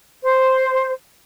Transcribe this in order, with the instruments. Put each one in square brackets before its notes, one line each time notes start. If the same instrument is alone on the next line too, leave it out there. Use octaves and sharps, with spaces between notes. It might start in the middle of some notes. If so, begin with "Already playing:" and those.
[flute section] C5